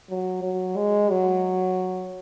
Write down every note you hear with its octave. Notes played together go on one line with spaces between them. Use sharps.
F#3
F#3
G#3
F#3